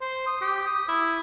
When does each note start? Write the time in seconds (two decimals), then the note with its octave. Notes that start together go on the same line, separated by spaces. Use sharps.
0.01 C5
0.27 D#6
0.42 G4
0.67 D#6
0.88 E4